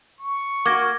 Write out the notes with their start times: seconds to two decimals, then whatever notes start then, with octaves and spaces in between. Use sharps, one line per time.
0.20 C#6
0.66 A#3 F#4 D6 G#6 A#6